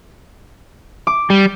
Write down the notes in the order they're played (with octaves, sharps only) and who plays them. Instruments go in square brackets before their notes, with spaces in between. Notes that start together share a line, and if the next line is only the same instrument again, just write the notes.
[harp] D6
[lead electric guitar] G3